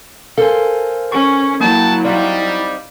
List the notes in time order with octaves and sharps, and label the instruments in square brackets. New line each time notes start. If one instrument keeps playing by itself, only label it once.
[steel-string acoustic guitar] A4 A#4 C5 [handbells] F5 G#5
[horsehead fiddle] C#4 [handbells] C#6
[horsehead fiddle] F#3 E4 [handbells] A#3 [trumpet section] G5 A5
[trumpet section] G3 [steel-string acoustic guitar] C4 D#4 [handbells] D5 F5